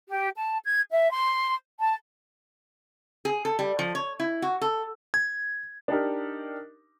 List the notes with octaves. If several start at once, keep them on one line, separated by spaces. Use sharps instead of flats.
G4
A5
G#6
E5
C6
A5
G#4
A4
G3
F3
C#5
E4
F#4
A4
G#6
D4 D#4 G4 A#4